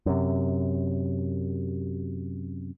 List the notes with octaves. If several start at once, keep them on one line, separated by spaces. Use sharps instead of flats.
F#2 C3